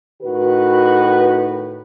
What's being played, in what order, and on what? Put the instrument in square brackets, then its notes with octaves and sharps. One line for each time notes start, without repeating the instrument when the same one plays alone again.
[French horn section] A2 D#3 F#4 B4